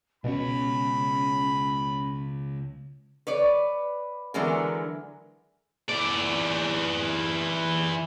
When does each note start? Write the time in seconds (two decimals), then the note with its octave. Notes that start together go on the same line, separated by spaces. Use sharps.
0.24 C#2 B2 C#4 C#5 B5
3.27 B4 C#5 D5
4.34 D3 E3 F#3 G#3 B3 A#4
5.89 E3 D5